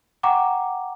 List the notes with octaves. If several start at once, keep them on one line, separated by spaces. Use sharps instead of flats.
F#5 G5 A#5 C#6 D6